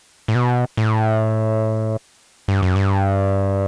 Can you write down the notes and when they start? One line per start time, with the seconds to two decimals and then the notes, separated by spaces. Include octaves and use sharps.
0.28 A2
0.35 B2
0.77 A2
2.48 G2
2.62 F#2
2.76 G2